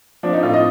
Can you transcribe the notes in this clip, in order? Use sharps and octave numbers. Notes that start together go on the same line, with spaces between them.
F3 D4
D#4
A2 F4
D#5